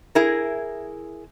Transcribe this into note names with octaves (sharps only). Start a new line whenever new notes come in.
E4 G#4 A#4